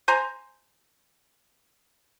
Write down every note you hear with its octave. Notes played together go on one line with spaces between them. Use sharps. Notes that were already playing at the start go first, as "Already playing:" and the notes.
C5 G#5 A#5